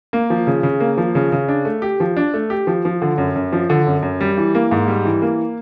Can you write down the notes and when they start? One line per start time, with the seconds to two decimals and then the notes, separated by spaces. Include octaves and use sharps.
0.13 A#3
0.30 F3
0.47 C#3
0.63 C#3
0.80 A#3
0.98 F3
1.15 C#3
1.32 C#3
1.48 D4
1.65 A3
1.82 G4
2.00 F3
2.17 D4
2.34 A3
2.50 G4
2.67 F3
2.85 F3
3.02 D3
3.18 F#2
3.35 F#2
3.52 F3
3.70 D3
3.87 F#2
4.03 F#2
4.20 G3
4.37 E3
4.55 A#3
4.71 G#2
4.88 G3
5.05 E3
5.22 A#3